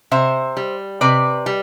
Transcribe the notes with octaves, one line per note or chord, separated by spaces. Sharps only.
C3 C5 E5
G3
C3 B4 D5
G3